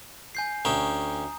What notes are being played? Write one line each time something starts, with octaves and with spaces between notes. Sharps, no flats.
G#5 G6 C7
D2 C#4 G5 A#5 D#6 E7